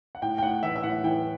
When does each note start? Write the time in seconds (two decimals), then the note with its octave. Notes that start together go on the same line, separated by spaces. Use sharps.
0.15 F#5
0.22 A2 G5
0.38 G5
0.43 A2 F#5
0.63 E3 E5
0.76 E5
0.83 A2 F#5
1.04 E3 G5